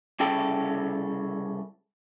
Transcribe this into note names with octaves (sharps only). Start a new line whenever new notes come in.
C2 C#3 A4 G5